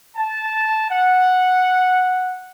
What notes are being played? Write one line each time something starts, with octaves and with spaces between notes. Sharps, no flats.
A5
F#5